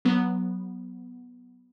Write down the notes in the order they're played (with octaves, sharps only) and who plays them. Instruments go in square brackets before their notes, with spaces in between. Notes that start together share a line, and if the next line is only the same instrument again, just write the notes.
[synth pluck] F#3 B3